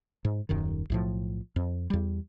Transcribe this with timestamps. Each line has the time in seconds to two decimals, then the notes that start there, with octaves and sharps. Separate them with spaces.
0.25 G#2
0.49 D#1 F#2 D#3
0.90 B1 A2 F3
1.56 F2
1.90 E2 G3